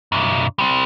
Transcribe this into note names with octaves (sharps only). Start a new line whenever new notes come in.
B1 F#2
G3 C4